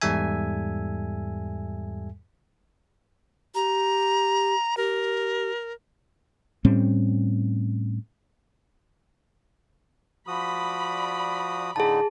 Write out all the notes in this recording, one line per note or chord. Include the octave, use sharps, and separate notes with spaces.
E2 G#2 G3 A4 E5 G#5
G4 A#5
G4 A#4
A2 G3 C4 C#4
F3 F#4 D5 B5 D#6
A2 D3 D#4 G#4 A5